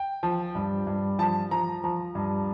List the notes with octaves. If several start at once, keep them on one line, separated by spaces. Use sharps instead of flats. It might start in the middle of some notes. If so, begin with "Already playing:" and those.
Already playing: G5
F3
G2
G2
F3 A5
F3 A#5
F3 A#5
G2